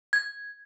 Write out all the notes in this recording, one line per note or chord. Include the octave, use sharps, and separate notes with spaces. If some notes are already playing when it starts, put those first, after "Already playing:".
G#6